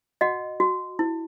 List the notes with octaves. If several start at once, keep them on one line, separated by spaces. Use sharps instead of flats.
F#4 D#5 F#5
F#4
E4